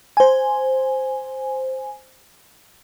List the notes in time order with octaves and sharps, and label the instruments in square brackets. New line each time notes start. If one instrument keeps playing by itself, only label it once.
[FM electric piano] C5 G#5